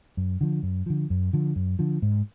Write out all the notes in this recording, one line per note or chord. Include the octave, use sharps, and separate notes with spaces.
F#2
D3 F3
F#2
D3 F3
F#2
D3 F3
F#2
D3 F3
G#2